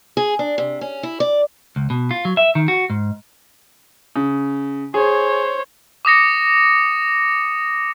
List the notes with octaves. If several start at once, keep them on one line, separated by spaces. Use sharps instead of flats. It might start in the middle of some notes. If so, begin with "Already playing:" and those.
G#4
D4
C3
C#4
E4
D5
C#2
B2
F4
F#3
E5
D#3
F#4
G#2
C#3
G#4 C5 C#5
D6 D#6 A#6 C#7